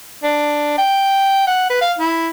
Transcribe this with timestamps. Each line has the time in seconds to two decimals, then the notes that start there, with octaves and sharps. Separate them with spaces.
0.23 D4
0.78 G5
1.47 F#5
1.70 B4
1.81 F5
1.98 E4